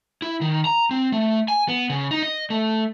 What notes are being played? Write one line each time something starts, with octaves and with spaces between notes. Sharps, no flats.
E4
D#3
A#5
C4
A3
G#5
B3
C#3
D#4
D#5
A3